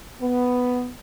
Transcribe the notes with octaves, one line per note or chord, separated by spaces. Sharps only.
B3